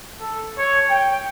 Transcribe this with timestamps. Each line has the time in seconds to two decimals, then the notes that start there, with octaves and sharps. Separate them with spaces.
0.20 A4
0.56 C#5
0.87 G5